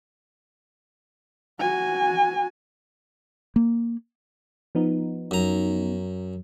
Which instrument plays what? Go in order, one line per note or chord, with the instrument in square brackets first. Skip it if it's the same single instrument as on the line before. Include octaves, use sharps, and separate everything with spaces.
[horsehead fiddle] F#4 G#5
[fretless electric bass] A#3
[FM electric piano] F3 B3 D#4
[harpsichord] F#2 A#5